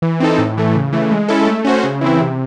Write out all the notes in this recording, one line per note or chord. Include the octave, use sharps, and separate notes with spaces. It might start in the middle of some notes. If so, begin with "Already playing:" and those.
E3
C4 D#4 A4
A2
E3 A3
C#3
E3 A3
G#3
C#4 E4 A4
A3
C#4 F#4 C5
C#3
E3 C4 E4
C3